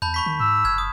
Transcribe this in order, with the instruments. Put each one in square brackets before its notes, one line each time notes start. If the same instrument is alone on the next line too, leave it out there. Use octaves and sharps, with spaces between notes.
[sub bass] E2 [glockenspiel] A5 B5 G6
[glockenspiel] B5 C#6 B6
[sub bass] D#3
[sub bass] G#2 [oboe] E6
[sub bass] F#1 [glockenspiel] F6 G#6
[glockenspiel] D#6